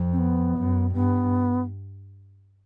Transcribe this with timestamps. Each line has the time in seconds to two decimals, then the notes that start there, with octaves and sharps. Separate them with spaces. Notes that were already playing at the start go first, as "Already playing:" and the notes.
Already playing: F2
0.12 C4
0.19 B3
0.57 F#2
0.94 G2 B3